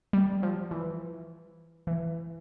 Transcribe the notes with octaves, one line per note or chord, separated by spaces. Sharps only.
G3
F3
E3
E3